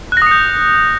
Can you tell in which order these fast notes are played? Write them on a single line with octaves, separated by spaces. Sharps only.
F#6 A#6 D#6 C#7 G6